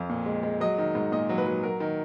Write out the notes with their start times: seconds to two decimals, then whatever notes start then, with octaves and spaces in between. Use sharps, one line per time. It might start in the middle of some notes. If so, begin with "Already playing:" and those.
Already playing: F2 F5
0.09 A#2
0.26 G#3
0.43 G#3
0.60 F#3 D#5
0.78 D#3
0.95 G#2
1.12 A#2 D#5
1.29 F#3
1.38 B4
1.46 F#3
1.63 F#3 A#4
1.80 D#3